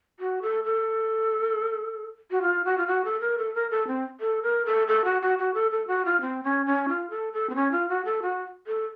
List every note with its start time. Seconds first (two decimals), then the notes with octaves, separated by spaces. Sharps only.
0.20 F#4
0.42 A4
0.64 A4
2.31 F#4
2.42 F4
2.65 F#4
2.78 F4
2.87 F#4
3.05 A4
3.21 A#4
3.38 A4
3.55 A#4
3.71 A4
3.87 C4
4.20 A4
4.43 A#4
4.66 A4
4.88 A4
5.05 F#4
5.22 F#4
5.39 F#4
5.54 A4
5.71 A4
5.88 F#4
6.05 F4
6.21 C4
6.44 C#4
6.66 C#4
6.88 F4
7.10 A4
7.33 A4
7.50 C4
7.55 C#4
7.72 F4
7.89 F#4
8.05 A4
8.22 F#4
8.67 A4